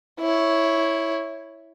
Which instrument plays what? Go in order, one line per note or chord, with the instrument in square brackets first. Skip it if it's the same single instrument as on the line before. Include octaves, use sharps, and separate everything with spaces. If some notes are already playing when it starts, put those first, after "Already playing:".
[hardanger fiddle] E4 C#5